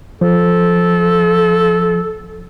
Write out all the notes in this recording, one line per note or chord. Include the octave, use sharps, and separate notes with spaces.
F3 A4